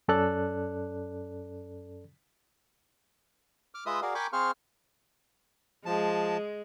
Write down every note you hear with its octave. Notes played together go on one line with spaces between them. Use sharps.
F#2 C#4 A4 D5 F#6
D6 F6
G#3 F4 B4 D#5 E5 D#6
F#4 G#4 A#4 D5 F5
A#4 G5 G#5 B5 C#6 D6
C4 G#4 C5 F5 C#6 F6
F3 G#3 A5